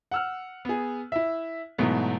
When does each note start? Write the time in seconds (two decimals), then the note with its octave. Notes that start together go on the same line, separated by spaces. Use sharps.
0.11 F#5 E6 F6
0.65 B3 G#4
1.12 E4 E5
1.78 G#2 B2 E3 F#3 A3 B3